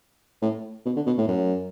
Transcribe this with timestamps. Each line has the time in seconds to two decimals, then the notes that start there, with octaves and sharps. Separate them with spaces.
0.42 A2
0.86 B2
0.96 D3
1.07 B2
1.18 A2
1.28 F#2